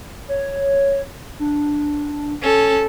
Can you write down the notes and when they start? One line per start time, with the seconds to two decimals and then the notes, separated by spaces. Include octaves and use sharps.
0.28 C#5
1.39 D4
2.42 C#4 A4